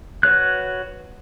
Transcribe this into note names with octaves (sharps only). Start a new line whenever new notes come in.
F#4 B4 C#5 F#6